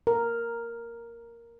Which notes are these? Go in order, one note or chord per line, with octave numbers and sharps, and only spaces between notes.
A#4